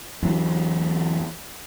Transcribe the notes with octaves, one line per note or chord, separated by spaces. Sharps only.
E2 F#3